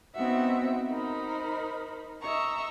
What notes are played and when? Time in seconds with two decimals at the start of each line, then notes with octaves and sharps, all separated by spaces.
0.14 B3 C4 D#4 F#4 E5 F#5
0.89 D#4 A#4 C5 B5
2.21 D#5 E5 A#5 C#6